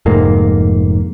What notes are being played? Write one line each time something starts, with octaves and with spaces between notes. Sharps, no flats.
F1 G#2 A#3